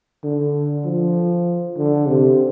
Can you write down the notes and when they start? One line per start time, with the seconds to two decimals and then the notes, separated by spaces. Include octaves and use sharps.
0.24 D3
0.85 F3
1.77 D3
2.07 C3